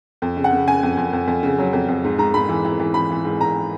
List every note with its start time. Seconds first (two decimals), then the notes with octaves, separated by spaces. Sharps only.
0.22 F2
0.37 C#3
0.44 F#5
0.53 C#3
0.67 C#3 G#5
0.83 F2
0.97 F2
1.13 F2
1.27 F2
1.43 C#3
1.59 F#3
1.73 F2
1.88 F2
2.04 G#2
2.18 G#2 A#5
2.34 G#2 B5
2.49 E3
2.65 E3
2.80 E3
2.94 E3 B5
3.10 E3
3.25 G#2
3.41 G#2 A#5